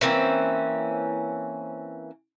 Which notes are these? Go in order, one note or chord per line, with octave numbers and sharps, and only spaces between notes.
E3 A#3 C4 C#4